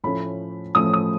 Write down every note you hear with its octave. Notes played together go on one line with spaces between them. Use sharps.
A2 F3 A3 C#4 B5
A2 F3 A3 C#4 D#6
D#6